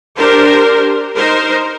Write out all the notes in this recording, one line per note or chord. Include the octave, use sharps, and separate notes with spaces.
D4 G4 A#4 C5
D#4 A#4 C5